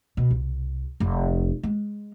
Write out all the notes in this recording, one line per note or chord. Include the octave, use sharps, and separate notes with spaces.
B2
C2
F1
G#3